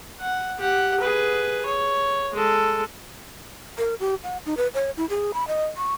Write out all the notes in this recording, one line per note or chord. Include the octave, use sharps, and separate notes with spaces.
F#5
G4 F#5
G#4 B4
C#5
G#3 A4
A#4
G4
F#5
D#4
B4
C#5
E4
G#4
B5
D#5
C#6